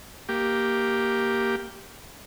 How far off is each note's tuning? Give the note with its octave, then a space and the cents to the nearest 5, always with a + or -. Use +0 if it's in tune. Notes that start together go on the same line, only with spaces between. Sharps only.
A#3 +0 G4 +0